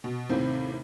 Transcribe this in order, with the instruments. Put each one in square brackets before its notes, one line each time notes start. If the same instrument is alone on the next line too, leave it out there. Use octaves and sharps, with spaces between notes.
[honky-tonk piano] B2
[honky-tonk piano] D#2 A2 C3 [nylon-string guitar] C4